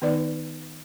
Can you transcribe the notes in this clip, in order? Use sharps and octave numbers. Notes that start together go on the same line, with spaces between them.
D#3 B3 D#4 B4 D5